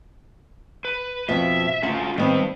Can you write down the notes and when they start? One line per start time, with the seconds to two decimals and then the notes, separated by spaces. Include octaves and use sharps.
0.85 B4
1.29 F2 B2 F3 E5
1.83 D2 C#4 F4 F#5
2.18 D#3 G3 B3 C4 B4